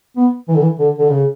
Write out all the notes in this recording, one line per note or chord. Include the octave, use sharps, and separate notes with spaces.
B3
E3
D3
E3
D3
D3
C#3